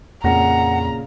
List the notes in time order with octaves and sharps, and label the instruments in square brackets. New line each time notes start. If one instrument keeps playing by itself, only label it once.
[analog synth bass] F2 [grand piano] A#2 C#3 A#6 [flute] F#5 [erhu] A#5